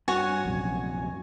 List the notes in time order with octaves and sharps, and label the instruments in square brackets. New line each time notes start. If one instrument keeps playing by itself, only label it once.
[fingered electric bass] G2 [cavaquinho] F#4 C#5 F#5 [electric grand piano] G#5
[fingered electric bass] A#1 F#2 C3